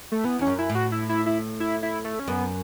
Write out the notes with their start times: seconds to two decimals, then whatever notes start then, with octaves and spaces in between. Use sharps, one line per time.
0.12 A3
0.24 E3 B3
0.39 E2 C#4
0.47 F#2
0.59 E4
0.70 A2
0.75 F#4
0.92 E4
1.09 E4
1.26 E4
1.60 E4
1.83 E4
2.05 A3
2.19 C#4
2.28 F#2 B3